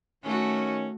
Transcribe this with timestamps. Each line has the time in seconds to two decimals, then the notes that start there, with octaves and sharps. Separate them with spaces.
0.23 D#3 A3 C#4 F#4